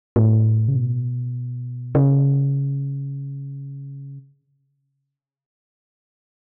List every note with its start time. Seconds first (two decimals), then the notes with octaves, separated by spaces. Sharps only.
0.16 A2
0.68 C#3
0.76 B2
1.95 C#3